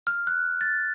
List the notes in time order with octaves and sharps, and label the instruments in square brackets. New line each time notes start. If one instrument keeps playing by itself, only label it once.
[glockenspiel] F6
F#6
A6